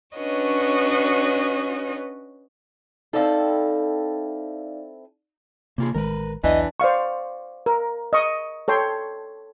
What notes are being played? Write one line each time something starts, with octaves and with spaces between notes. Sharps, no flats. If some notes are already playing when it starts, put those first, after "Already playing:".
C#4 D4 F#4 B4 C#5 D#5
C4 D#4 E4 A4 D5 F5
C3 A#3 F4 G#4
A1 D#3 G#3 A#4 B4
B1 E2 E3 D4 D#5
C5 D5 F5 C#6
A#4
D#5 C#6
A4 C#5 G5 C6